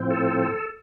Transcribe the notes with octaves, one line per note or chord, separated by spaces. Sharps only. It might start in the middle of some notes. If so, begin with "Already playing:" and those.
Already playing: A2 F3 C4
A4